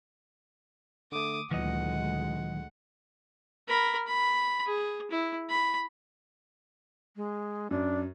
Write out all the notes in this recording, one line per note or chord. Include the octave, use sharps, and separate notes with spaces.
D3 A3 D6 D#6
D2 A#2 D#3 E3 F#3 G#3 D#5 F#5
A#4 B5
B5
G#4
E4
B5
G#3
F#2 D4